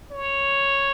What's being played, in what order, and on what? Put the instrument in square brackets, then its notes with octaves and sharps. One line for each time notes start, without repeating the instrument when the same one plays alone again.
[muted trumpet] C#5